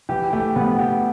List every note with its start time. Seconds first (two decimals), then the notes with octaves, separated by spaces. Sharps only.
0.09 E3 G4
0.32 A3 G4
0.56 B3
0.79 G4